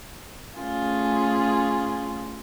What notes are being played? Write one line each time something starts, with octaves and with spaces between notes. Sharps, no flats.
A3 C#4 F4 G#4